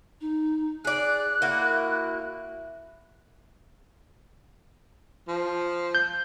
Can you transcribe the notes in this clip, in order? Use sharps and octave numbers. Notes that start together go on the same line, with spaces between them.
D#4
G#4 D5 F#6
A#3 E4 F#4
F3
G6